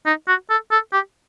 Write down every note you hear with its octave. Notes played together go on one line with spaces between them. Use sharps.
D#4
F#4
A4
A4
G4